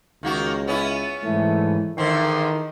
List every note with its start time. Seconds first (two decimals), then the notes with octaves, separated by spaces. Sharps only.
0.23 C#2 D#3 A#3 F#4
0.67 B3 C#4 E4
1.24 G#2 E3 A3
1.98 E2 D3 D#3 C4 C6